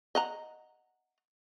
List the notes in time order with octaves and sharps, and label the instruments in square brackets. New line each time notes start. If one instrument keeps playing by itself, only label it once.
[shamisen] D#5 F#5 A#5